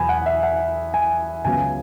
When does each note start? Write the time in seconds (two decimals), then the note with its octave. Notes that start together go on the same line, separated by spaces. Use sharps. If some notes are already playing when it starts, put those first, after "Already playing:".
Already playing: E2 B2 F#3 G#5 B5
0.09 F#5
0.26 E5
0.43 F#5
0.94 G#5
1.45 C#2 C#3 F#3 B3 G#5